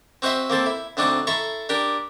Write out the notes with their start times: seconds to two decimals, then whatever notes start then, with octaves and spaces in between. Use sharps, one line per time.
0.22 C4 F#4 C5 D#5 E5
0.50 A#3 C4 A4 C5
0.66 E4
0.97 D2 C4 D4 D#4 F#4
1.27 E4 A4 A#5 C6 C#6
1.69 D4 G4 A#4